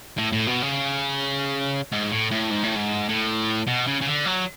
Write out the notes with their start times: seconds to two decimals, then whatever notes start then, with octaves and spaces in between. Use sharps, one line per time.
0.18 A2
0.32 A2
0.47 B2
0.62 C#3
1.93 G#2
2.12 A2
2.32 A2
2.51 G#2
2.64 A2
2.76 G#2
3.09 A2
3.67 B2
3.87 C#3
4.01 C#3
4.06 D3
4.26 F#3